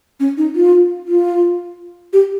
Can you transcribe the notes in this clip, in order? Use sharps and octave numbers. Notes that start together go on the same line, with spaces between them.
C#4
D#4
F4
F4
G4